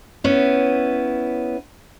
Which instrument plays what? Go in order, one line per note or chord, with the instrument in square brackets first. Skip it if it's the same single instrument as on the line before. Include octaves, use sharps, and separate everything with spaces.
[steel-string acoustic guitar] B3 C#4 E4